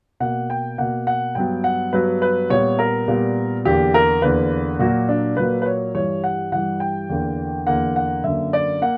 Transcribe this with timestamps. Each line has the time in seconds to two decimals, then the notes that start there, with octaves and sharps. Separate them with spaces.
0.20 B2 A#3 F#5
0.50 G5
0.78 B2 A#3 F#5
1.07 F#5
1.35 G2 F#3 B3 G5
1.64 F#5
1.93 G2 F#3 B3 B4
2.22 B4
2.50 A#2 G3 B3 C#5
2.79 A#4
3.08 A#2 G3 B3
3.65 E2 D3 A#3 G4
3.94 A#4
4.22 E2 D3 A#3 B4
4.79 A#2 F#3 A#3 F#4
5.09 D4
5.37 A#2 F#3 A#3 B4
5.62 B4
5.66 C#5
5.95 G2 E3 G3 C#5
6.24 F#5
6.52 G2 E3 G3 F#5
6.80 G5
7.09 E2 D3 A#3
7.67 E2 D3 A#3 F#5
7.96 F#5
8.24 F#2 D3 A#3 E5
8.53 D5
8.82 A#3 F#5